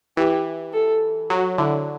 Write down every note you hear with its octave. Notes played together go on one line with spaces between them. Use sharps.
E3 G4
A4
F#3 F#4
D3 E4